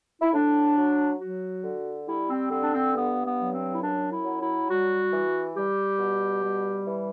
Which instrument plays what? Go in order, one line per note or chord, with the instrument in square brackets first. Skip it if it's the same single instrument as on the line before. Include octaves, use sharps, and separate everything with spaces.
[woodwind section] E4
A2 D4
F#3
F#3 F#4
D3
G3 E4
C4
D3 C4
D4
C4
G2 B3
B3
F#3
C4
E4
F#2 D4
E4
F#3
E4
G3 F#4
E3
G3 G4
B2
G3
E3